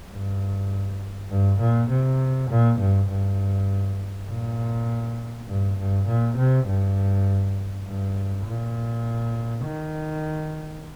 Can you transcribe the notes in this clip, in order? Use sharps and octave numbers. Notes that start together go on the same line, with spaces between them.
G2
G2
A#2
C3
A#2
G2
G2
A#2
G2
G2
A#2
C3
G2
G2
A#2
D#3